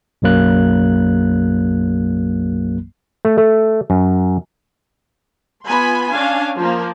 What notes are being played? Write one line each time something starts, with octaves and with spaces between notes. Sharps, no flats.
B1 F#2 F#3 A#3 F#6
A3
A3
F#2
B3 F4 G#5 B5 C6
C#4 D4 F5 G#5
F3 A#3